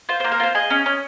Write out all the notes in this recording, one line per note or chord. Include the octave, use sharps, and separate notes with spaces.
F4 C5
A#3 C5
A#4
F4 C5
G#4 D#5
C#4
C#4